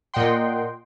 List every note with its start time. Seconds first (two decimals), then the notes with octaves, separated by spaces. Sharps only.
0.14 A#2 D#5 F#5 G5 C6